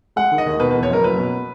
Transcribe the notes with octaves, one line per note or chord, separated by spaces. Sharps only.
G#3 F#5
D#3
D#5
D#2
B2 B4
B4
E2
C#5
F#1 A#4
F#3 B4
B2